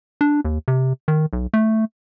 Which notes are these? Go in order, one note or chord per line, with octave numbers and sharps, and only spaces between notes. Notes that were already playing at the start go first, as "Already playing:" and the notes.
D4
D#2
C3
D#3
B1
A3